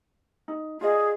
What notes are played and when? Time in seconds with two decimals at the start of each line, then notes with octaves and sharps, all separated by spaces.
0.48 D#4
0.81 F4 G#4 D5 D#5